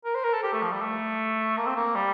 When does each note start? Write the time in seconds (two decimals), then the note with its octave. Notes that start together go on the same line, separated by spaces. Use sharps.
0.05 A#4
0.15 C5
0.24 A#4
0.33 A4
0.43 G4
0.53 A3
0.62 F3
0.72 G3
0.81 A3
1.57 A#3
1.67 C4
1.76 A#3
1.95 G3